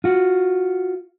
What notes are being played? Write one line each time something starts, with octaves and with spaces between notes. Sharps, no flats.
F4 F#4